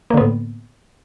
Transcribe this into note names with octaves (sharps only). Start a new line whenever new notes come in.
A2 D3 A#3 B3